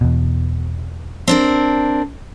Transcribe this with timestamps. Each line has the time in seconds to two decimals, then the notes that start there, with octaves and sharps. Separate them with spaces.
0.01 E2 B2
1.28 C4 D4 A#4